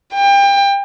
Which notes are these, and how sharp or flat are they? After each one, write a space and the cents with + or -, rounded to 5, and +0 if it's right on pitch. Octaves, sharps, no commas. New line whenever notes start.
G5 +30